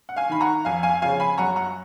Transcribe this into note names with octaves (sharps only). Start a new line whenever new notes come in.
F#5
F5 G#5
D#3 B5
F#5 A#5
F2 F5 G#5
F5 G#5
C#3 F3 F5 G#5
G#5 B5
F#2 F#5 A#5
F#5 A#5